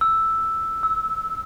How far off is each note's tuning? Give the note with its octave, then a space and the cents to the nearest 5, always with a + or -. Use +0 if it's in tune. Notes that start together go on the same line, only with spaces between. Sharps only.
E6 +0
E6 -20